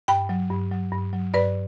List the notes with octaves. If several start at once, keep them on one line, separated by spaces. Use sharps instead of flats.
G2 G5 B5
F#3
G2
F#3
G2
F#3
G2 B4 D5